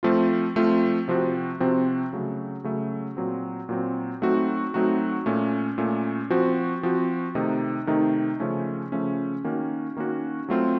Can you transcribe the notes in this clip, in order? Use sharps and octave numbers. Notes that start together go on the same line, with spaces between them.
F3 A3 C4 F4
F3 A3 C4 F4
C3 F3 C4 F#4
C3 F3 C4 F#4
C#3 F#3 A3
C#3 F#3 A3
A#2 F#3 C4
A#2 F#3 C4
F#3 A3 C4 D#4 F#4
F#3 A3 C4 D#4 F#4
A#2 A3 C#4
A#2 A3 C#4
F3 C4 F#4
F3 C4 F#4
C3 D#3 A3 D#4
C3 D#3 A3 D#4
C#3 F3 A3 C#4
C#3 F3 A3 C#4
D#3 A#3 C#4 F#4
D#3 A#3 C#4 F#4
F#3 A3 C4 F4